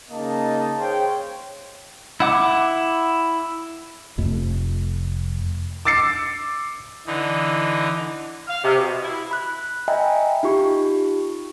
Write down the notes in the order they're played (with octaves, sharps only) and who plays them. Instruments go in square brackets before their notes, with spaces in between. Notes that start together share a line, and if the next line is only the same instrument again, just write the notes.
[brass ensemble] C#3 A#3 D#4 D#5 A5
G#4 C5 C#5 F5 G5
[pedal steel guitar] E4 F#5 D6
[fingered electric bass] F1 F2 A3
[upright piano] D6 E6 A6 C7 C#7
[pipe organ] D3 E3 D#4
[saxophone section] F5
C3
B2
E4
[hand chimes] B5 F#6
D#5 E5 G5 G#5 A#5 B5
D#4 F4 G4 C#6